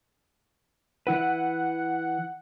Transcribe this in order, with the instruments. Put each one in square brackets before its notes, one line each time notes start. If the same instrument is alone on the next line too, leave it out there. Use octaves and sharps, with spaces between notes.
[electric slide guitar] E3 E4 B4 [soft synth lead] F#5